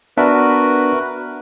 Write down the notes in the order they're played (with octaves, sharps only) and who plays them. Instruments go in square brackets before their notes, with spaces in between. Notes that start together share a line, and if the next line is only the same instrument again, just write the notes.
[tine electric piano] B3 D4 E5 [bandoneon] F#4 A#4 B4